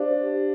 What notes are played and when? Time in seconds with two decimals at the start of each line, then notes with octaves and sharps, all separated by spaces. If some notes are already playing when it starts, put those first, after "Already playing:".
Already playing: D4 G4 C5 F5